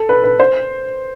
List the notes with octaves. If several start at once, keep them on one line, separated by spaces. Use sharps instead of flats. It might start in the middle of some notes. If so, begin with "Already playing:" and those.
Already playing: A4
B4
B4
C5